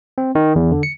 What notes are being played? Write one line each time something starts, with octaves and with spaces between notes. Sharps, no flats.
C4
D#3
E2
D3
C#7